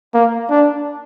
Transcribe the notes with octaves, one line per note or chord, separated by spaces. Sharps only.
A#3
D4